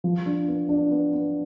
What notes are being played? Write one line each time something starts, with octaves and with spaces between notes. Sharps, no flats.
F3
D4
B3
D4
B3
B3